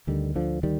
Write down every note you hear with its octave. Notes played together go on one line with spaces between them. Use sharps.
D2 D3 D#3 G3
D3 F3
D#3 G3